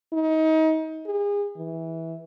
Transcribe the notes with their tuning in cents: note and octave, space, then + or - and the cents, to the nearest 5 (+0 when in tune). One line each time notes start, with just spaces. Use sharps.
D#4 +30
G#4 -35
E3 -15